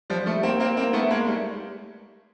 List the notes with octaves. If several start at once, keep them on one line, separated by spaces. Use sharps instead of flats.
F3 G3
G3 A3
A#3 C4
A#3 C4
A#3 C4
A3 B3
G#3 A#3
G3 A3